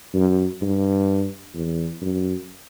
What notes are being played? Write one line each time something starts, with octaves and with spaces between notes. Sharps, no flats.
F#2
G2
E2
F#2